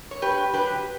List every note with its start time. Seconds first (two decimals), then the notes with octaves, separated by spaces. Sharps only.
0.11 C#5
0.21 G2 G4 B4
0.54 F#3 G4 B4